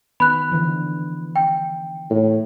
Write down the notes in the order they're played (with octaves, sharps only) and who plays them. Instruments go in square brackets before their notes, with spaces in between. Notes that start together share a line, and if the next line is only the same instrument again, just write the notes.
[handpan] D#3 B3 [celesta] B5 F#6
[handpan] D3 E3 F3
[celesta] G5
[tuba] A2